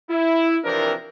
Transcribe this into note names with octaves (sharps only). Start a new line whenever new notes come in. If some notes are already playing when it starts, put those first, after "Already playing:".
E4
C3 E3 F3 C4 D4 A#4